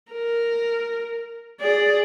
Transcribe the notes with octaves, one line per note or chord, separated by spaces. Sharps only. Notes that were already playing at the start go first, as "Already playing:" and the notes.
A#4
G#4 D5